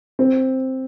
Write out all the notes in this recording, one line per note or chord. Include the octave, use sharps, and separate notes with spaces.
C4